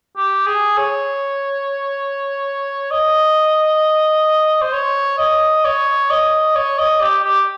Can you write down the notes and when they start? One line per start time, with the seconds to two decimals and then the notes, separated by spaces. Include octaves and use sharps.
0.17 G4
0.47 G#4
0.78 C#5
2.91 D#5
4.62 C5
4.73 C#5
5.18 D#5
5.65 C#5
6.10 D#5
6.55 C#5
6.79 D#5
7.01 G4
7.24 G4